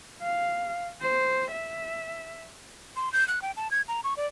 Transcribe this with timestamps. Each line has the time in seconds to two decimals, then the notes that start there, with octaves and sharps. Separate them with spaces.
0.22 F5
1.01 C5
1.52 E5
2.96 C6
3.13 G6
3.28 F#6
3.42 G5
3.57 A5
3.71 G#6
3.88 A#5
4.04 C#6
4.17 D5